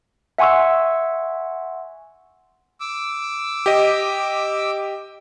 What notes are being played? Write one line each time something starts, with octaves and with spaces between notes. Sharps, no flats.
E5 F#5 G#5 C6 C#6 E6
D6 E6
G4 D#5